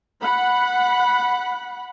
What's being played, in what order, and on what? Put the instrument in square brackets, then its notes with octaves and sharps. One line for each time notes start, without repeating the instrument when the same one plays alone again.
[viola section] F#5 B5